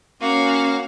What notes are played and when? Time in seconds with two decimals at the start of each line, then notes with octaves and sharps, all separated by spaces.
0.21 A#3 C#4 F#4 F5